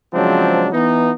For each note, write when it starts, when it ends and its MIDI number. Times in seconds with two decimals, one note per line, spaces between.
0.13 0.67 49
0.13 0.67 53
0.13 0.67 54
0.13 0.67 56
0.13 0.67 60
0.13 0.67 62
0.73 1.11 52
0.73 1.11 59
0.73 1.11 63